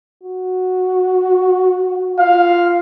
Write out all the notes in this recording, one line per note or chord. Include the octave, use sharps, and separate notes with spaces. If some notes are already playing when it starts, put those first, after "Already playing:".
F#4
F4 F5